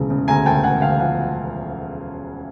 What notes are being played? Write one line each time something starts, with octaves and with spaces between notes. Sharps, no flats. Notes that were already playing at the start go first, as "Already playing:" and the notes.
Already playing: E1 D2 C#3
C#3
D2 G#5 A#5
D2 G5 A5
E1 F#5 G#5
D2 F5 G5
F3 F#5 G#5